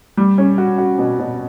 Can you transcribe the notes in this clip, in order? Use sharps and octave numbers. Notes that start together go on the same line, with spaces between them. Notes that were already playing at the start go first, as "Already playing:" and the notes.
G3
C#4
F#4
F#4
B2
B2